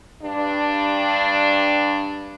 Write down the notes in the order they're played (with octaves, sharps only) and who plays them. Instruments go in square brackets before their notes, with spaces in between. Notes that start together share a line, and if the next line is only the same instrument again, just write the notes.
[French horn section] G2 D4